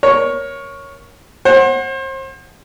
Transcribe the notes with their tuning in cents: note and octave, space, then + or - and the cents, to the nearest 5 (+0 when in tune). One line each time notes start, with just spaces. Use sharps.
A#4 +20 C#5 +0
C5 +35 F#5 +0